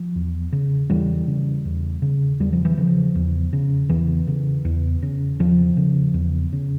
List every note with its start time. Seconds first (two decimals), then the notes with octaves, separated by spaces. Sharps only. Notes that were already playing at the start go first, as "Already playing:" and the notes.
Already playing: F3
0.16 E2
0.52 C#3
0.90 E2 E3 G3
1.27 C#3
1.65 E2
2.02 C#3
2.40 E2 G3
2.53 F3
2.65 E3
2.77 C#3 F3
3.15 E2
3.53 C#3
3.89 E2 E3
4.27 C#3
4.65 E2
5.02 C#3
5.39 E2 F3
5.77 C#3
6.14 E2
6.53 C#3